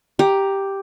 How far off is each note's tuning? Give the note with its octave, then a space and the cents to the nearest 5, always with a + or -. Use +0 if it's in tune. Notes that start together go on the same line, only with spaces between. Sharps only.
G4 +0 A#5 +5